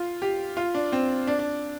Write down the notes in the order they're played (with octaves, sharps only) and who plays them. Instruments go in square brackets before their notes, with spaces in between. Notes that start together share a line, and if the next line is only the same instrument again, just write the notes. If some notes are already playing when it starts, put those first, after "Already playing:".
Already playing: [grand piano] F4
G4
F4
D4
C4
D4
D4